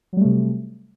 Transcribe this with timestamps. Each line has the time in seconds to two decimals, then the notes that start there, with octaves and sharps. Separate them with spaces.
0.13 F#3
0.17 G3
0.21 A3
0.25 C3